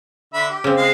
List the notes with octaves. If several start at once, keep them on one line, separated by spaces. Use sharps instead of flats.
D3 E5 B5
G4
C#3 C4
G#3 G#4 F5